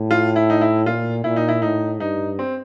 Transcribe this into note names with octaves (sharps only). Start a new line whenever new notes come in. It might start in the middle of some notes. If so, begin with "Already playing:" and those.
Already playing: A2
F4
E4
D#4
E4
A#2 F4
A#2 E4
D#4
E4
A2 D#4
G2 D#4
C4